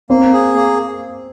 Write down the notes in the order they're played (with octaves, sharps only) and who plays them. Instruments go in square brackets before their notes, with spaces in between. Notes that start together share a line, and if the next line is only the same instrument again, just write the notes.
[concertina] A#3 [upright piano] C4
[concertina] G#4
A#3